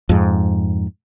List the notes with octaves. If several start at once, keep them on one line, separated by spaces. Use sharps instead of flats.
F2 G#2